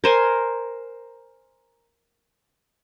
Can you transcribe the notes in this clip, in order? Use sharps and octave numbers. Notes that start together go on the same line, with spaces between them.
A#4 C5 G#5